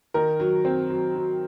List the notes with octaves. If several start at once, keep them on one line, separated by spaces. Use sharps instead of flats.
D#3 A#4
F#3
C4
F#3
F#3